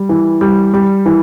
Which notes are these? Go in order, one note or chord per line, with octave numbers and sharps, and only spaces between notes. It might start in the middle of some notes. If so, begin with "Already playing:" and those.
Already playing: G3
E3
G3
G3
E3